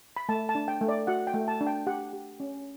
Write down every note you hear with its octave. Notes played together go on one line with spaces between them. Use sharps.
B5
A3 A5
A5
D4
G5
A3
D5
F#4 F#5
G5
A3
A5
D4
G5
G4 F#5
G4
C#4